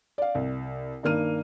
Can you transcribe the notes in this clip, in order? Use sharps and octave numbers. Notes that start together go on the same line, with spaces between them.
D5 F5
C2
G2 D#3 A#3 F6 D#7